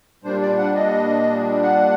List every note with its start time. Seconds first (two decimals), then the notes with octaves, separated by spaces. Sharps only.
0.24 A#2 G3 D4 C5
0.41 D5
0.58 F#5
0.75 D#5
1.63 F#5